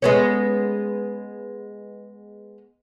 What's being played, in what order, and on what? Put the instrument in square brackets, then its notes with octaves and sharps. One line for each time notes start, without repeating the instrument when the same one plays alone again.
[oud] G#3 B3 C#4